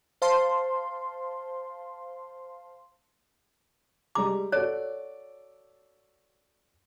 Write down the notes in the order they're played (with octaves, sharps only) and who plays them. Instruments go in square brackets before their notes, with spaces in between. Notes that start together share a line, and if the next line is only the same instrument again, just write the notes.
[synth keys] C5 F5 A5 C6
[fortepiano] G3 G#3 A#5 [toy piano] D6
[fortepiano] F#4 A4 D5 [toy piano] C#5